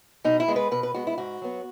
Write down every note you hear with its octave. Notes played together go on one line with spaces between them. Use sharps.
B2 D#4
E4
G#3 B3
B4
B2 B4
B4
G#3 B3 F#4
E4
G#2 F#4
F#3 B3